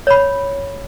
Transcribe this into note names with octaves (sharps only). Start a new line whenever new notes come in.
C#5 B5